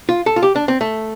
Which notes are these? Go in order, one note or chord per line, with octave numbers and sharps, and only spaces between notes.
F4
A4
F4
G4
D4
C4
A3